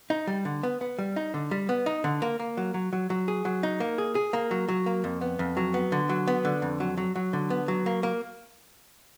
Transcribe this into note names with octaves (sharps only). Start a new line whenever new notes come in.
D#4
G3
D3
B3
B3
G3
D#4
D3
G3
B3
D#4
D3
A#3
A#3
F#3
F#3
F#3
F#3
G#4
F#3
D#4
A#3
G#4
G#4
A#3
F#3
F#3
A#3
F2
B3
F2
F#3
B3
D3
F#3
B3
D3
F2
F#3
F#3
F#3
D3
B3
F#3
A#3
A#3